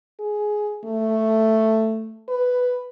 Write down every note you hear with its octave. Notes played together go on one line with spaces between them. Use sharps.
G#4
A3
B4